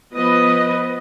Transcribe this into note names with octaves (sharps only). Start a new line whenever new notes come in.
F3 B3 B4 D#5